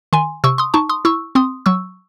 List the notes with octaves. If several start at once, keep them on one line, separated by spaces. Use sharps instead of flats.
D#3 G#5 C6
C3 C#6 E6
C6 D#6
D#4 A5 C#6
C6 D#6
E4 C#6 E6
C4 C6 D#6
F#3 C#6 E6